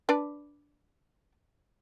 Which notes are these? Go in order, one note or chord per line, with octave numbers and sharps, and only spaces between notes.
D4 B4 D5